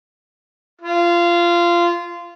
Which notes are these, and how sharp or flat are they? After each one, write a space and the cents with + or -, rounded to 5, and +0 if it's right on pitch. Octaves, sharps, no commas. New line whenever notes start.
F4 -20